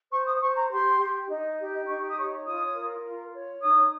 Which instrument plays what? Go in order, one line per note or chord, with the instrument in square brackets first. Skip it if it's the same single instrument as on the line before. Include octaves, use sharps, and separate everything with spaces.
[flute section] C5 C#6
D#6
C5 C#6
A#5
G4 C6
G4
D#4
G4
D#4 C#6
D#6
C#5 C#6
F4 D#6
A#4
F4
C#5
D#4 D#6